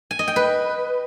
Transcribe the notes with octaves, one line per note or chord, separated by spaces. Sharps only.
G#5
D#5
G5
B4